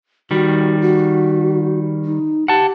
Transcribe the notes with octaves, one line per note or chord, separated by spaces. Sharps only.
D#3 G3 F#4
F#4
D#4
G4 F#5 A5